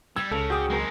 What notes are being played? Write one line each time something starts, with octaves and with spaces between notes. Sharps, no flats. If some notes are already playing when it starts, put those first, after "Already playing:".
G3 E6 G#6
C#2 C#3 A4
F#4 G#4 G5 D6 D#6 G6
F#1 G#3 C4 A#4